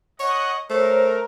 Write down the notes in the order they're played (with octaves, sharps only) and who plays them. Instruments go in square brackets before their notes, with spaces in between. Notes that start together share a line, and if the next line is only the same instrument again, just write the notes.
[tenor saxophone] C#5 [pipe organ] D#5 F#5
[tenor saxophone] A3 [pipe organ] A#4 [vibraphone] C5 C#5